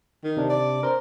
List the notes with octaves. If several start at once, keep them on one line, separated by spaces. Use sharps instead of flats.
D#3
C3 D4
D5
A#4 C5